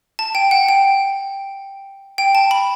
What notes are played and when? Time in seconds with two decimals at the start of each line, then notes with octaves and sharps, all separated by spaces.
0.19 A5
0.35 G5
0.51 F#5
0.69 G5
2.18 G5
2.35 A5
2.51 B5